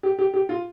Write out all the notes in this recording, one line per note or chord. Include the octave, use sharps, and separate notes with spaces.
G4
G4
G4
F4